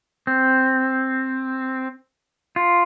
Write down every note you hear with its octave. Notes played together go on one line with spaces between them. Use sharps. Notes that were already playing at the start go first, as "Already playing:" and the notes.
C4
F4